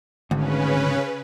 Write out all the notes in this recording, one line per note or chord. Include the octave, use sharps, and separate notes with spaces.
G#1 D2 C#3 C#4 B4